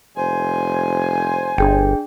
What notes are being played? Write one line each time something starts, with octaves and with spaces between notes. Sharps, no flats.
F1 C5 G#5
G1 D4 G#4 G5